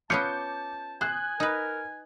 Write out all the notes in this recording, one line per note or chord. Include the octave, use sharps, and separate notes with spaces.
B3 C#4 F4 A5 D6 G6 C#7
C5 G#5 D#6 F#6 G6
D#4 A#4 B4